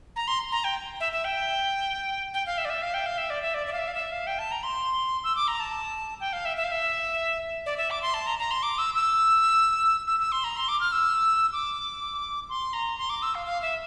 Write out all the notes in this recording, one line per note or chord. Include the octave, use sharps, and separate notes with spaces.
A#5
C6
A#5
G5
E5
E5
G5
G5
F5
E5
D5
E5
F5
G5
F5
E5
D5
E5
D5
D5
F5
E5
F5
E5
F5
G5
A5
A#5
C6
E6
D6
A#5
A5
G5
F5
E5
E5
F5
E5
D5
E5
D6
C6
A5
A#5
A#5
C6
D6
E6
E6
E6
E6
C6
A#5
C6
D6
F6
E6
D6
C6
A#5
C6
D6
E6
F5
F5
E5